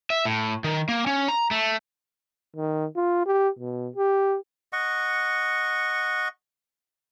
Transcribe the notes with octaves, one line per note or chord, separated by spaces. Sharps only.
E5
A2
D#3
A#3
C#4
A#5
A3
D#3
F4
G4
B2
G4
D#5 F#5 C#6